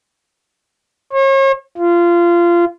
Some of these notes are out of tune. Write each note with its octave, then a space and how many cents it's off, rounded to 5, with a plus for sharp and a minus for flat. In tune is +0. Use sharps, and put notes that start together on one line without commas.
C#5 -40
F4 -20